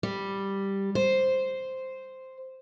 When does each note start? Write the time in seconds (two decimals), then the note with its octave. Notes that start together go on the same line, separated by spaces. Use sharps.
0.03 G3
0.95 C5